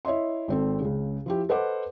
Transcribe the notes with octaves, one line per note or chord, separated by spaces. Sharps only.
E4 C#5 D#5 E5 C6
G#1 C4 A4
C#2 C#3
F3 E4 G4
A4 B4 C5 D#5 F#5 D6